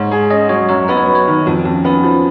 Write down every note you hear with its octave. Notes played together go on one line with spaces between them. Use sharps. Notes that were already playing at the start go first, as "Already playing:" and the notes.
Already playing: G#2 C#5
G#4
C#4 D#5
F#3 C#5
F#2 C#5
B3 D#5
C#5
F#3 B4
C#5
D#3
F2 F#4
F4
F2
C#4
B3 C#4
F3